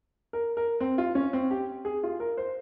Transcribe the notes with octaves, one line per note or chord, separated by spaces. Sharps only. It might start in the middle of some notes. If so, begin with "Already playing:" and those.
A#4
A#4
C4
F4
C#4
C4
G4
G#4
F4
A#4
C5